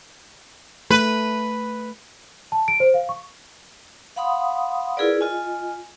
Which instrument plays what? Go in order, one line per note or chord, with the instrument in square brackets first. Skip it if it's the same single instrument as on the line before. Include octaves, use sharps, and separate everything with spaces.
[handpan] A3 [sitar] B4
[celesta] A5
D7
C5
F5
C#6
[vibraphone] F5 F#5 B5 C6 D#6
E4 F4 G#4 A#4 B4 D5
F4 D#5 G#5